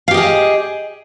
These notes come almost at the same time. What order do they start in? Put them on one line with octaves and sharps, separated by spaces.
F5 G4 D#5 G#4